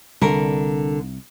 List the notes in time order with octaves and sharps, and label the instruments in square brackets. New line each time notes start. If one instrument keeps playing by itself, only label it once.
[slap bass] C2 [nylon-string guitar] D3 A#4